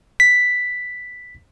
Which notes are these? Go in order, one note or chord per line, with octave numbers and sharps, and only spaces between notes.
B6